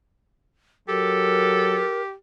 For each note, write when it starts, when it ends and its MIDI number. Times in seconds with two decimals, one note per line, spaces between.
0.88 1.83 54
0.88 2.13 67
0.88 1.96 69
0.88 2.01 70